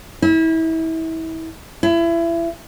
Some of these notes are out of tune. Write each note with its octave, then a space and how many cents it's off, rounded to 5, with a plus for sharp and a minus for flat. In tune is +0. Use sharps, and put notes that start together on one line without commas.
E4 -30
E4 +30